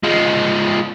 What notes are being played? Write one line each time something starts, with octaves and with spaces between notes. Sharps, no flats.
F3 G#3